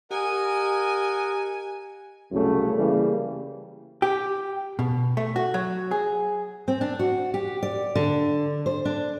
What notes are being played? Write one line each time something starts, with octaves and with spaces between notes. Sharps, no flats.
G4 A#4 D#5 F#5 G#5
C2 F#2 C#3 A3
C#3 E3 G3 A#3
G4
B2
A3
F#4
F#3
G#4
C4
D4
F#4
G4
D5
D3
C5
D4